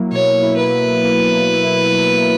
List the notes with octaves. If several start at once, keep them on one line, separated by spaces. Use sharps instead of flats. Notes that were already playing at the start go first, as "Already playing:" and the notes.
Already playing: F#3 A#3 E4
B2 C#5
E4
B4
F#3
A#3
B2
E4
F#3
A#3